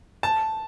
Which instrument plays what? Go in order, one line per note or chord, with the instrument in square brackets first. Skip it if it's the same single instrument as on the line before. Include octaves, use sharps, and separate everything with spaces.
[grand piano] A5